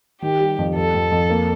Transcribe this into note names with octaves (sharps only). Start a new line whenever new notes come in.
D#3 G4
G3
F2
F2 A4
F2
F2
A#3